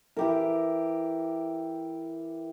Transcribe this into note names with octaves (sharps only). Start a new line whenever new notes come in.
E3 G4 A#4